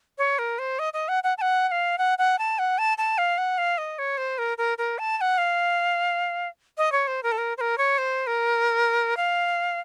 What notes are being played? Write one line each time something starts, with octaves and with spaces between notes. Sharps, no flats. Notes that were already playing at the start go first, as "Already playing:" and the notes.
C#5
A#4
C5
D#5
D#5
F#5
F#5
A5
F#5
F#5
F5
F#5
F#5
A5
F#5
A5
A5
F5
F#5
F5
D#5
C#5
C5
A#4
A#4
A#4
A5
A5
F#5
F5
D#5
C#5
C5
A#4
A4
A#4
C5
A#4
C#5
C5
A#4
F5